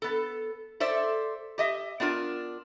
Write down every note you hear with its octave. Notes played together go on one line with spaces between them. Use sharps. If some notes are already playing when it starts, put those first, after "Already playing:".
B3 A4
A4 C5 D5 E5
G4 D#5 E5
B3 D4 F4 A#4